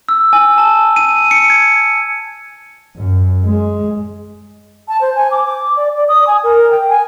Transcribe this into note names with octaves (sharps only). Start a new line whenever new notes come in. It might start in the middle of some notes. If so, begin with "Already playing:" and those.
E6
G#5
A5
D#7
C#7
G#6
F#2
G#3
A5
C5
G#5
D6
D6
D5
D5
D#6
G#5
A#4
G5
G#5